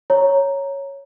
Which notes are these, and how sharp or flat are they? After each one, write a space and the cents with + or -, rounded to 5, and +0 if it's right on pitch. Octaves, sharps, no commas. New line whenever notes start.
C#5 +0 A#5 +0